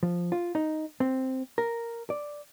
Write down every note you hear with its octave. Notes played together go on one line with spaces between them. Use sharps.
F3
F4
D#4
C4
A#4
D5